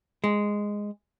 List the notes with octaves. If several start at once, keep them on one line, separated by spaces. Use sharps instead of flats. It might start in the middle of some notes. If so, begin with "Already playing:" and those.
G#3